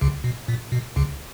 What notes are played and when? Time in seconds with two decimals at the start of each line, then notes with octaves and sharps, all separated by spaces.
0.01 C#2 C#3
0.24 B2
0.48 A#2
0.72 B2
0.96 C#2 C#3